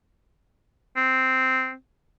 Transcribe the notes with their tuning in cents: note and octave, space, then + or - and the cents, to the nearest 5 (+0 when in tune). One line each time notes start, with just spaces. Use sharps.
C4 -5